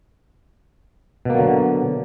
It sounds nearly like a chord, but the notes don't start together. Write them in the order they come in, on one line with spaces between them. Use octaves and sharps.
B2 A#3 F#3 D3